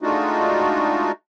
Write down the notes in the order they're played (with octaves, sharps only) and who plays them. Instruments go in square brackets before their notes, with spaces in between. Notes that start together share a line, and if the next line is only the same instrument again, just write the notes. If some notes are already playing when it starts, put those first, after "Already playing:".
[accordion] G#3 A3 D4 D#4 F4 F#4